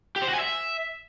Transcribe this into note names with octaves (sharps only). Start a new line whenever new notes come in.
G4
C5
F#4
G#5
E5